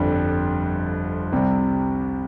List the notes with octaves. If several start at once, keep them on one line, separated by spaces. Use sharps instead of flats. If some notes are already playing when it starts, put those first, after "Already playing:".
Already playing: G1 F2 D3 G3
C2 C3 G3